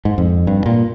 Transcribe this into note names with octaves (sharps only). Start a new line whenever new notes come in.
G#2
F2
G2
A#2